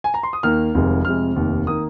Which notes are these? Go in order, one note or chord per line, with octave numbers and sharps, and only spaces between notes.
G#5
A#5
C6
D#6
D#2 D#3 A#3 F6
F1 F2 D#3 G#3
F1 F2 C3 G#3 F6
F1 D#2 D#3
D#3 A#3 D#6